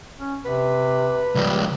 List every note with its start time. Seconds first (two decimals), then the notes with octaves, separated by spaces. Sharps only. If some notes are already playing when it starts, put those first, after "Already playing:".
0.19 C#4
0.45 C3 B4
1.35 C#2 F3 G3